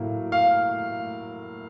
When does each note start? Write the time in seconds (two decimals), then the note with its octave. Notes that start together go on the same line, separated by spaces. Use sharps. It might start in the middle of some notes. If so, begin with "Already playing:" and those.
Already playing: A2 F#3 A#3
0.32 F5